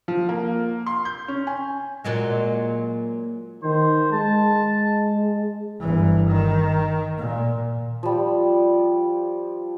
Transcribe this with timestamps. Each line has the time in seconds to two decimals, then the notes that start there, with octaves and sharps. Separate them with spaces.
0.08 F3
0.29 A#3
0.86 C6
1.05 G6
1.28 C#4
1.47 G#5
2.04 A#2 F#3 G#3
3.63 D#3 C5
4.12 G#3 A5
5.80 G1 E3
6.28 D#3
7.18 A#2
8.03 F3 G3